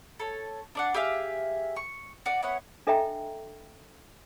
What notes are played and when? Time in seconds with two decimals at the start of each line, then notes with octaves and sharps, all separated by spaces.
0.20 A4 C#5
0.75 D4 D5 F#5
0.94 G4 G#4 E5 F5
1.76 C#6
2.26 F#4 D5
2.43 B3 E4 C#5 F#5
2.87 D4 A4 D#5 E5 G5 A#5